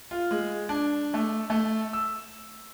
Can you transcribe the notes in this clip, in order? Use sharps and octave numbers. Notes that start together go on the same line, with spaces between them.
F4
G#3
D4
A3
A3
E6